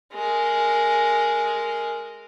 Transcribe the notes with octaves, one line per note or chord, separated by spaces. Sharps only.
G#3 A#4